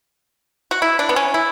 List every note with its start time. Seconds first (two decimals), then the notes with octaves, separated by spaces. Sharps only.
0.71 F#4
0.82 E4
0.99 D4
1.09 B3
1.16 C#4
1.34 E4